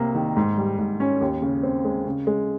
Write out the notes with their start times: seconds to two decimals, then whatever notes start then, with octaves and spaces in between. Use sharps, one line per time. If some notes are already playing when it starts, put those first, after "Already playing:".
Already playing: C2 C3 A#3
0.15 D#3
0.37 G#2
0.57 G3
0.79 G#2
1.00 C#4
1.21 D#2
1.42 C#3
1.63 C4
1.85 G#3
2.06 C#3
2.27 G#3